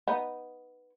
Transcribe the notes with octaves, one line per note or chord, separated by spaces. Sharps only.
B3 D#4